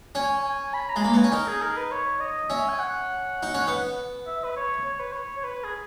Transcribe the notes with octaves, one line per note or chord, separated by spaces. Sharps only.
C#4 G#5
G#5
B5
A#5
G#3 G#5
A#3 A#5
B3 G#5
C#4
D#4 A#4
G#4
A#4
B4
C#5
D#5
C#4 E5
G#5
F#5
D#4
C#4
B3
E5
B4
C#5
C#5
B4
C#5
C#5
B4
G#4